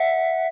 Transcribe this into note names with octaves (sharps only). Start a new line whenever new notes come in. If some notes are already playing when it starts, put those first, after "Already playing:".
Already playing: E5 F#5